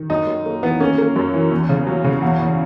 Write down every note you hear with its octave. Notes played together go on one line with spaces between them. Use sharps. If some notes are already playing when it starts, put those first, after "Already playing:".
Already playing: D#3
F#2 D#4
F#2
A#3
E3 B3
A#3 C#4
A#3
F#2
E3
E2
C#3
F#3
C#3
E2 F#4
E2